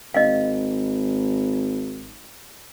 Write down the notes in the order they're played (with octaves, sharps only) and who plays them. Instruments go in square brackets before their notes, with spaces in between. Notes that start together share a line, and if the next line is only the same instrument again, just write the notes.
[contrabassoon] G#1 [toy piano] D#5 F5